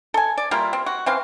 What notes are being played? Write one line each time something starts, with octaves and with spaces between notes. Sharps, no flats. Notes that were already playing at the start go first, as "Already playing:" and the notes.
A4 G#5
D5
G3 A#3 E4 F4
C4
F#4
E3 C4 F5